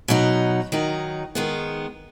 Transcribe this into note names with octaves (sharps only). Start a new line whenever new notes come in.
B2 F#3 D#4
D#3 F#3 D#4
D#3 G#3 B3